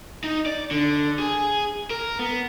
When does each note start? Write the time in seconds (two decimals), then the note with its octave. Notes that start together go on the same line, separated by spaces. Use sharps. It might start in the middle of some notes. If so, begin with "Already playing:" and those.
0.24 D#4
0.46 D5
0.71 D3
1.19 G#4
1.91 A#4
2.19 B3